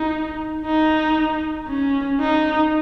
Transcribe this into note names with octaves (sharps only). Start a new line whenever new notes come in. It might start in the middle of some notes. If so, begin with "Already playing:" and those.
Already playing: D#4
D#4
C#4
D#4